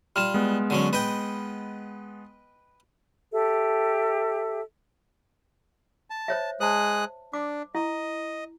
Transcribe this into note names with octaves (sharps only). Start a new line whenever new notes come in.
G3 F4 F6 E7
G#3 B3
D3 F#3 C#4
B4 D#5 G5
G4 A4 E5
A5
C5 C#5 E5
G#3 C5 A5 D#6 F#6
D4 D6
E4 D#5